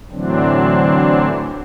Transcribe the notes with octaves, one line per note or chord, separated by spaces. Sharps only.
A2 D3 E3 F#3 C4 D4